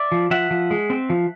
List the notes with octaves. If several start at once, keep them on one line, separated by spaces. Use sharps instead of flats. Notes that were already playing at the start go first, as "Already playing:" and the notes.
Already playing: D5 E5
F3
F3 E5 F#5
F3
G#3
C4
F3